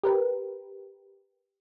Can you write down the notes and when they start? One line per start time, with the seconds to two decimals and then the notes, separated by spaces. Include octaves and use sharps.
0.03 G4 A#4 B4